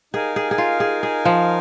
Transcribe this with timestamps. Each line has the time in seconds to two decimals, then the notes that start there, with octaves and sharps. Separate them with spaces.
0.14 D#4 G#4 A#4 F5 G#5
0.36 G#4
0.51 G#4
0.58 F4
0.80 G#4
1.03 G#4
1.25 F3